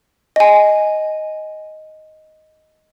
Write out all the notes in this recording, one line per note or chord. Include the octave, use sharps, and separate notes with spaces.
D#5 G#5